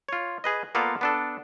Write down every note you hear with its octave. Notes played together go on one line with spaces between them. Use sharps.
F4 C#5
G#4 B4 D#5
A#3 B3 F4 A4 D5 F5
B3 D4 A4